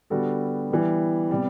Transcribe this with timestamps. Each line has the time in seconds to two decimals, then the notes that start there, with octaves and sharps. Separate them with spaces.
0.10 D3 G3 B3 F#4 A4
0.71 E3 G3 B3
1.30 C3 G3 B3